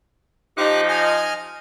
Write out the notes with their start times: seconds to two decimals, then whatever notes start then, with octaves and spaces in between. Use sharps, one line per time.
0.57 F3 D#4 G4 D6 F#6
0.89 D#5 G#5 F6